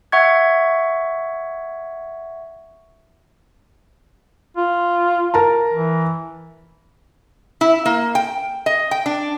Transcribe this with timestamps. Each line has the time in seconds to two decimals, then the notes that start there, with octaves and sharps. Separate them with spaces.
0.12 E5 F#5 C#6 G#6
4.57 F4
5.34 A#4 A5 A#5
5.73 E3
7.61 E4
7.86 A#3
8.15 G5
8.66 D#5
8.91 G5
9.06 D4